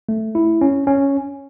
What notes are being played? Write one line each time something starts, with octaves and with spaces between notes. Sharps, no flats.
A3
E4
C#4
C#4